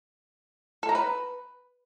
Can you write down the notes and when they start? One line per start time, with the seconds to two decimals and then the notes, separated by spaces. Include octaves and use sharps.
0.83 A4
0.89 A#5
0.95 B4